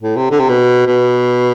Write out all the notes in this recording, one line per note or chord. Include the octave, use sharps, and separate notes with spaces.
A2
C3
D3
C3
B2
B2